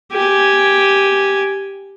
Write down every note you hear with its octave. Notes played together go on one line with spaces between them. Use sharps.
G4 G#5